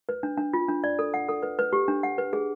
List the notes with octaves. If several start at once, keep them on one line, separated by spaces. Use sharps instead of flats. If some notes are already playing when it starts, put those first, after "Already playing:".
B4
D4
D4
F4
D4
D5
A4
F#5
A4
B4
B4
G4
D4
F#5
B4
G#4